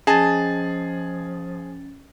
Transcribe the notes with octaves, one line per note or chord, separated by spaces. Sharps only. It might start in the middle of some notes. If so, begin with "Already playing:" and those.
F3 C#4 G#4 D#5 A5 A6